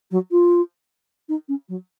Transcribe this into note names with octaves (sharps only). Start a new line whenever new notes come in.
F#3
F4
D#4
C#4
F#3